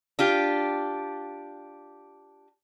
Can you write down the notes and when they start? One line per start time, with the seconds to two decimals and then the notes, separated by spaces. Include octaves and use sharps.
0.19 D4 F4 G4